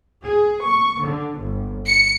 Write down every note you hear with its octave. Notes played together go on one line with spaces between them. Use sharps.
G#4
C#6
D3
G1
C#7